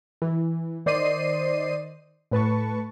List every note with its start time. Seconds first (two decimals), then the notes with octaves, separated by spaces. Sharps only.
0.22 E3
0.86 D#3 C5 D5 D#5 C7 D#7
2.31 A2 B4 A5 C#6